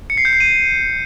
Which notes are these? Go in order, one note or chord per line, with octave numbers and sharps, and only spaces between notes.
C#7
C7
G6
C7
D#7